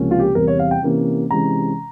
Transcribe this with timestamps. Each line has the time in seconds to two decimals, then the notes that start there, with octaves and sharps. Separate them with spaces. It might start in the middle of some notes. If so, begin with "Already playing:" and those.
Already playing: C#2 C3 F3 A#3 C#4
0.11 F4
0.20 G4
0.35 E2 C3 G3 C4 A#4
0.47 C#5
0.59 F5
0.71 G5
0.83 C3 E3 A#3 C#4
1.31 C3 E3 G#3 C#4 A#5